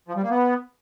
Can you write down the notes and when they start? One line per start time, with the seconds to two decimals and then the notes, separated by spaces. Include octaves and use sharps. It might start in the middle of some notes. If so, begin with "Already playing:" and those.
0.08 F3
0.16 G3
0.23 A#3
0.31 B3